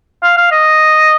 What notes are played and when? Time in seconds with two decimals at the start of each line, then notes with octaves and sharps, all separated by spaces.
0.23 F5
0.37 F5
0.51 D#5